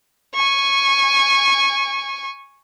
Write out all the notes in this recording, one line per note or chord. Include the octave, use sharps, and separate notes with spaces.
G#5 C#6